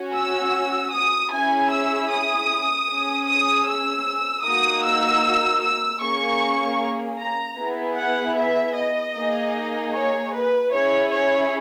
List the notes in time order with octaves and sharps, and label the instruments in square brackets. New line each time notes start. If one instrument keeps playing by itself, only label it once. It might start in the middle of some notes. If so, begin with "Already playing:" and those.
Already playing: [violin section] C#4 F#4
E6
D#6
C#4 E4 G#4 G#5
E6
D#6
C#4 G#4
D#6
E6
A#3 D#4 F#4 D#6
E6
E6
A#3 C#4 G#4 C#6
A#5
B3 E4 G#4
F#5
E5
D#5
A#3 D#4 G#4
C#5
B4
C#4 E4 G#4 C#5
C#5